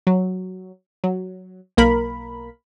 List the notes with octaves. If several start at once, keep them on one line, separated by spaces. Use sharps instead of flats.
F#3
F#3
B1 A#3 A#4 B5